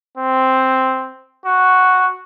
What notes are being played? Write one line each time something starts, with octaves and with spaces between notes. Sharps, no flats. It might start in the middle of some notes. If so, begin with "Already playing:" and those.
C4
F#4